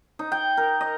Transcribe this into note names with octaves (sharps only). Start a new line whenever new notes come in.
D#4
G5
A#4
D#5